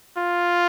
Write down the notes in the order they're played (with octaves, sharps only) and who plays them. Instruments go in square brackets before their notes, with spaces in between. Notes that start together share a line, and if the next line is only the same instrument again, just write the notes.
[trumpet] F4